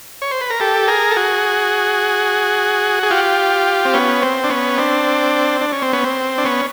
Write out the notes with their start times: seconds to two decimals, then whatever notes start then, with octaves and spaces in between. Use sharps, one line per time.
0.22 C#5
0.31 C5
0.41 B4
0.50 A#4
0.60 G4 A4
0.88 G#4 A#4
1.10 A4
1.16 F#4 G#4
3.03 G#4
3.10 F4 G4
3.85 C4
3.94 B3 C#4
4.22 C4
4.44 D4
4.49 B3 C#4
4.78 C4 D4
5.61 D4
5.72 C#4
5.82 C4
5.93 B3 C#4
6.04 C4
6.38 D4
6.44 B3 C#4